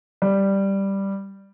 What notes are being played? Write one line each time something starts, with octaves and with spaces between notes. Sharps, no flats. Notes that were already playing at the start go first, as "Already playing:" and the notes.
G3